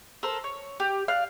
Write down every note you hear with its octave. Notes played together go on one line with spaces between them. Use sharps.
A4 A#4 C5
C#5
G4
D5 F5 F6 F#6